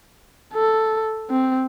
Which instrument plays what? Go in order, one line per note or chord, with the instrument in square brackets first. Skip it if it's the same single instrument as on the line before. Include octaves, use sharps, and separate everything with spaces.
[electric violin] A4
C4